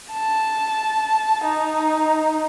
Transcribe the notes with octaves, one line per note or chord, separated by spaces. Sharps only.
A5
D#4